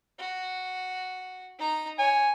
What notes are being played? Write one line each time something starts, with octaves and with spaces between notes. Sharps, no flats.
F#4
D#4 A#5
C#5 G#5